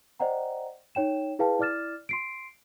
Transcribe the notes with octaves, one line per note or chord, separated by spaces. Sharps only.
C5 D5 D#5 F#5 G5 A#5
D#4 C#5 G5 E7
E4 G#4 B4 F5 G5 A5
E4 D5 D6 F6 A6 E7
C6 C7 D7